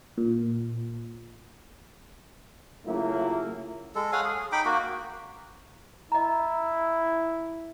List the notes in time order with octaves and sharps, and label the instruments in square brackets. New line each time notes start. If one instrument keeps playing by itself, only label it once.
[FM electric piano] A#2
[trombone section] C#3 F#3 A3 A#3 E4 F4
[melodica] G#3 A4
C#5 F5 F#5 G#5
G#4
D#4 G5 B5 D6
A#3 F#4
[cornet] E4 [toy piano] D#5 A#5